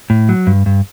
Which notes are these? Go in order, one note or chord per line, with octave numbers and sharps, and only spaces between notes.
A2
F#3
G2
G2